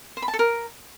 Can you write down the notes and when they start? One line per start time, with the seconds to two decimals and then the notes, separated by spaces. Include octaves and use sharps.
0.17 C5
0.22 B5
0.28 A5
0.34 A4
0.39 A#4